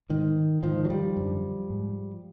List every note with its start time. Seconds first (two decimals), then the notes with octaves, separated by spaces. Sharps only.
0.10 G#2 D#3
0.63 G#2 D#3 F3
0.85 F#3
0.90 F3 G3
1.17 F#2 D3
1.70 G#2